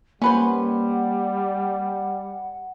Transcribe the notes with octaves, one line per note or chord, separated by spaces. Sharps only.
G3 A#3 C#4 B4 C5 F#5